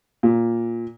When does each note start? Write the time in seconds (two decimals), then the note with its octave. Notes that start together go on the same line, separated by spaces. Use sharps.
0.23 A#2